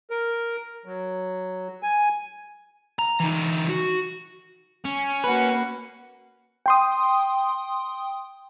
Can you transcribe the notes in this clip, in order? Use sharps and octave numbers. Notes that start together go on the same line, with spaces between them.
A#4
F#3
G#5
A#5
E3 D#4
F#4
C#4
A#3 F#4 B4
G5 C6 D#6